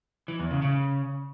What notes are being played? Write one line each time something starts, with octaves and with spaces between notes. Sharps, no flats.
E3
E2
C#3
C#3